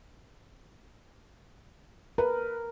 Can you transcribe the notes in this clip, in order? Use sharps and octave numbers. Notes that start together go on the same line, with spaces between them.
A#4 B4